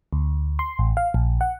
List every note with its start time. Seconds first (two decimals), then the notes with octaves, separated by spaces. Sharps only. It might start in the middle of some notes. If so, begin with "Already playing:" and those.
0.13 D2
0.59 C6
0.79 A1
0.97 F5
1.14 A#1
1.41 F#5